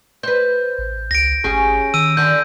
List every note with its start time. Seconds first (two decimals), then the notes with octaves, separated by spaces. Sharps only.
0.23 B4 C5 G6
0.78 A1
1.11 C#2 A#6 D7
1.44 G#1 C#4 G4 G#4
1.94 D#3 E6 D#7
2.17 D3 G6